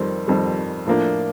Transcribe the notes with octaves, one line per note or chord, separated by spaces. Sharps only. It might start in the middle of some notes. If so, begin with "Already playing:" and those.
Already playing: F2 D#3 G3 C4
F2 D#3 G3 C4
A2 F3 A#3 D4